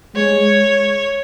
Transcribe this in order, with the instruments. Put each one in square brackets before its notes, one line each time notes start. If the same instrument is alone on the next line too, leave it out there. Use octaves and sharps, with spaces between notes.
[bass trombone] G#3 [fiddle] C#5